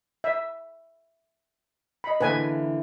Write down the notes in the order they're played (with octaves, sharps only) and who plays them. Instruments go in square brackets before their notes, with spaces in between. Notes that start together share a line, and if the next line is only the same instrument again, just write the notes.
[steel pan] E5
D#5 B5
[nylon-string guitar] D3 E3 A#3 [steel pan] B4 G#5